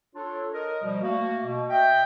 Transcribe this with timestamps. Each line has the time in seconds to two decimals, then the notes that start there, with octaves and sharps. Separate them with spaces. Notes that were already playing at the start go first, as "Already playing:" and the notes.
0.14 D4 F4 A4 C#5
0.53 A#4 D#5
0.82 B2 F3 G3
1.02 A3 A#3 F#4
1.43 B2
1.69 D#5 E5 G5